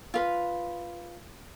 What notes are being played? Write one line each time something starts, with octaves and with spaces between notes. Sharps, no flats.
F4 B4